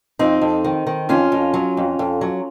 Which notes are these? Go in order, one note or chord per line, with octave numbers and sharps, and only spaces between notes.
F2 C4 D#4
F2
D#3
D#3
F2 C#4 F4
F2
F#3
F2
F2
F#3